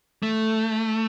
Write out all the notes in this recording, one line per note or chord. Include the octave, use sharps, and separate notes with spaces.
A3